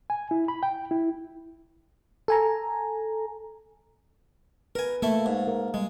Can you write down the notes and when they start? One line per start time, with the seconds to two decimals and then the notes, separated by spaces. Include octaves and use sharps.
0.10 G#5
0.31 E4
0.48 B5
0.63 G5
0.91 E4
2.28 A4 G#5 A#5
4.75 A#4 B4 G#5
5.02 A3 A#3 E4 A4
5.26 G#2
5.47 A#4
5.74 G3 G#3